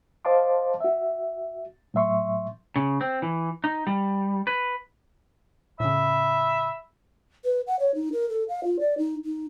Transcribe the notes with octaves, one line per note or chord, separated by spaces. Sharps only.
C5 D#5 F5 A5 C6 D6
F#4 E5
A2 F#3 E5 C6 C#6
C#3
C4
E3
D#4
G3
B4
A2 C#3 E5 B5
B4
F#5
C#5
D#4
A#4
A4
F5
F4
D5
D#4
D#4